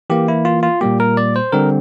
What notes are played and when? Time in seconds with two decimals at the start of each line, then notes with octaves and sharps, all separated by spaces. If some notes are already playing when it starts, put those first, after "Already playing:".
0.10 E3 A#3 G4
0.28 E4
0.45 F4
0.63 F4
0.81 A#2 G3 A#3 G4
1.00 A#4
1.17 D5
1.36 C5
1.52 D3 G3 C4 A#4